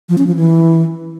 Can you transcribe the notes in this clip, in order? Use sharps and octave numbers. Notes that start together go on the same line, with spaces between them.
F3
C#4
F3
E3